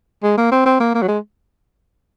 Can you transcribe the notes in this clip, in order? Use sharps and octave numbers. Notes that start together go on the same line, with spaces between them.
G#3
A#3
C4
C4
A#3
A#3
F#3
G#3